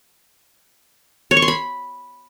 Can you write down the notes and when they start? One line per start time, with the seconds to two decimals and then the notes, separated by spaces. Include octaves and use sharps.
1.31 C#5
1.37 C#6
1.42 C6
1.48 B5